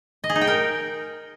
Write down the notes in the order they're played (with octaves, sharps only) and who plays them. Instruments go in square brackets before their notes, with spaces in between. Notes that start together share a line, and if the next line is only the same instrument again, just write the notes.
[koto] D#5
G#4
D#4
G5
A#4